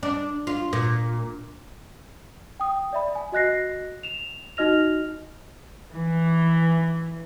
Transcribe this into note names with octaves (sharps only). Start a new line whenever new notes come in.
D4
F4
A#2
G5 D#6
D5 E5 B5
G#5
F#4 D#5 F#6 A#6 C7
E7 F7
D#4 F#4 D#5 F6 A#6 F7
E3